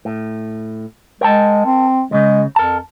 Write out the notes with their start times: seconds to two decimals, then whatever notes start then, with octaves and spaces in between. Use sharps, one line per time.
0.05 A2
1.21 G#3 A#4 G5 A5
1.65 C4
2.11 D#2 C#3 G#3
2.56 F2 A#4 A5